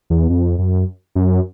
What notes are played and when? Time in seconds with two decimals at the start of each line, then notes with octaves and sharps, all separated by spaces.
0.10 E2
0.30 F2
0.59 F#2
1.15 F#2